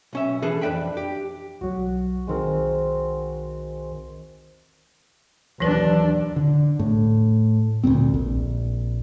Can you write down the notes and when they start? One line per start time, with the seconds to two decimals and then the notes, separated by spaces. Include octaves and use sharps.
0.13 B1 C#4 E5
0.42 E3 D4 G#4 A4 B4
0.61 F2 D4 B4 E5 G5 B5
0.97 G4
1.61 B1 F#3 F#4
2.27 B1 D#3 G#3 C4 A#4
5.60 D#2 E3 F#3 D4 B4
6.36 D3
6.79 A2
7.84 D2 A#2 B3 C4
8.14 A#1